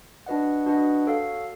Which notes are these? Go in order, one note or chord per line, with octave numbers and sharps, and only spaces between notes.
D4 F#4 B4 D#5 F#5
D4 F#4 B4 D#5 F#5
F#4 A4 C#5 F5